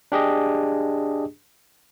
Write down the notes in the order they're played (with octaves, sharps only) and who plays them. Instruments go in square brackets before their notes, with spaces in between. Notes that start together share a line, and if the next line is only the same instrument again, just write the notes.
[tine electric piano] D4 G4 G#4 D#5